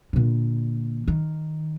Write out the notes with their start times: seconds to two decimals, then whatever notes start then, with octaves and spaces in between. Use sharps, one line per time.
0.13 A#2 D3
1.08 D#3